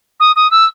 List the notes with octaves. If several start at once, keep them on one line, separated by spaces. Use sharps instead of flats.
D#6
D#6
E6